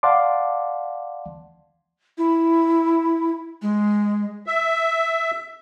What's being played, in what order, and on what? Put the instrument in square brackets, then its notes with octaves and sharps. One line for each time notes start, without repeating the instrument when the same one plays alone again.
[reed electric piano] D5 F5 F#5 A5 C6 D6
[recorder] E4
G#3
[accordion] E5